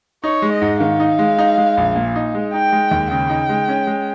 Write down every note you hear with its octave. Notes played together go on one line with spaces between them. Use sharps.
D#4 C#5
G#3
D#5
G#2
D#3 F5
D#4
G#3
D#4
G#3
A#1
A#2
D#4
G#3
D#4 G5
G#3
D#2
C#3 G5
D#4
G#3
C#4
G#3